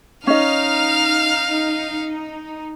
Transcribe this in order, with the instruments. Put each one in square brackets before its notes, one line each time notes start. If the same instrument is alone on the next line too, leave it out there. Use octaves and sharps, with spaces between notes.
[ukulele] C#4 D#5 [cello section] D#4 [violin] F5 [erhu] F6